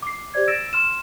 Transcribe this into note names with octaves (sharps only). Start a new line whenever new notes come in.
D6 C7
G4 C5 D5 G#6
E6 A6 A#6 D7 E7
C6 F6 E7